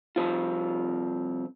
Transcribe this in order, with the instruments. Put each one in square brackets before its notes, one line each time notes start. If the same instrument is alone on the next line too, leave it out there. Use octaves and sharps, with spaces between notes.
[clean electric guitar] C2 C3 F3 C4 F4